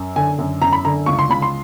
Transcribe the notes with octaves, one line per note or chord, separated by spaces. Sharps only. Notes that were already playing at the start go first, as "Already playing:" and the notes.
Already playing: F#2
D3 G#5
F#2
F#2 A#5
B5
D3 A#5
C#2 C#6
C6
C#2 B5
C6